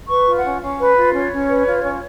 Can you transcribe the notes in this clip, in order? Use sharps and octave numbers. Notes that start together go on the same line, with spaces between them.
B4 C#6
F4
F#5
C#4
C#4 F5
B4
F4
C#4 C#5
C#4
B4
F4
C#4